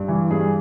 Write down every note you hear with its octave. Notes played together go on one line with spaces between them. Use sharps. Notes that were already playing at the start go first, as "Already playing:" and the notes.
Already playing: G2
E3
G2 G#4